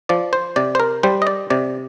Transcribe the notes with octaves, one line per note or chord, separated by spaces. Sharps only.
F3 D5
C5
C3 D5
C5
A#4
G3 C5
D#5
D5
C3 D5